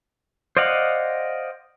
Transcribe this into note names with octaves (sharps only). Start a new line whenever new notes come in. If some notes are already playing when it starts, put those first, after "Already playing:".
C5 D5 D#5 F5 F#5